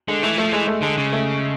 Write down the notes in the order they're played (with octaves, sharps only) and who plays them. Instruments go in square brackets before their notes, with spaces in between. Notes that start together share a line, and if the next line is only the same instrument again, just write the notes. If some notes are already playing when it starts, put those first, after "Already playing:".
[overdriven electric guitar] D3 [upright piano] G#3
[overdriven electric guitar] E3 [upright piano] A3
[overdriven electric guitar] F3 [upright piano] A3
[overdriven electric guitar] E3 [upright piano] G#3
[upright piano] A3
[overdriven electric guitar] D3 [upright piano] G#3
[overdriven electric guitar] C#3
[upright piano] A3